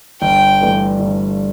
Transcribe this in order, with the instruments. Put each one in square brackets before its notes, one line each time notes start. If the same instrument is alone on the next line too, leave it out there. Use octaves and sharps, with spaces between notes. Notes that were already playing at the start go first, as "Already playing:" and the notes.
[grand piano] G1 [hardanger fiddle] G5
[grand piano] G2 E3 A3
G1